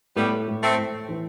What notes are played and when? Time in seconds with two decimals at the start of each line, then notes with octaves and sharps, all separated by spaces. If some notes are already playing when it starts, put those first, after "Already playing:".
0.16 A2 G3 B3
0.48 A2
0.63 A3 C4
0.78 A2
1.09 E3